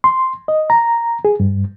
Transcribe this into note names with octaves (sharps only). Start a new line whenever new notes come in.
C6
D#5
A#5
G#4
G2